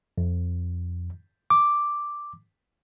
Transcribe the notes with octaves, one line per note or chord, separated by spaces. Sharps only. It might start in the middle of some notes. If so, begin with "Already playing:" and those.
F2
D6